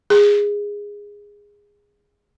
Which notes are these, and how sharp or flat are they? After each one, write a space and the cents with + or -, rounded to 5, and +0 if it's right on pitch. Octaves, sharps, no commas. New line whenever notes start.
G#4 -15